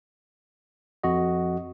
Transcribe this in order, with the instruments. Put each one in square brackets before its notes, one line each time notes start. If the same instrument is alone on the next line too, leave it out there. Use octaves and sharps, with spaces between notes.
[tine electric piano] F2 F#4 D#5